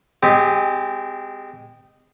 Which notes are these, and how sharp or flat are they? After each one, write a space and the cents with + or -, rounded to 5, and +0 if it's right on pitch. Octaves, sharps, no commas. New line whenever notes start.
G#3 -15 C4 -30 G4 +0